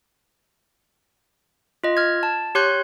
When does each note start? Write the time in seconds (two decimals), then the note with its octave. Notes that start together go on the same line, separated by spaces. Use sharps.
1.84 F4 D#5
1.97 F6 G#6
2.23 A5
2.55 G4 C#5 C6 F#6 G6